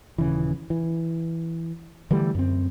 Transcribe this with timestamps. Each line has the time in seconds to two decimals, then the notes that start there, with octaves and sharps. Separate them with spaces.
0.18 D#1 C#3 E3
0.70 E3
2.11 D3 E3 G3 A3
2.35 F#2 C4